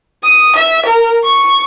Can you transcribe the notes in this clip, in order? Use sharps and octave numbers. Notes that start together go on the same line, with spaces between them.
D#6
E5
A#4
C#6